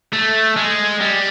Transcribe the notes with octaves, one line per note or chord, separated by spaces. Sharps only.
A3
G#3
G3